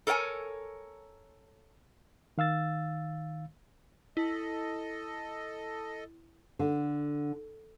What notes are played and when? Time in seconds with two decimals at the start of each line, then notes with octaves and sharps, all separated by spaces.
0.07 A4 A#4 C#5 F#5 G#5
2.38 D#3 F5 E6 A6
4.17 E4 A4 D#5
6.59 D3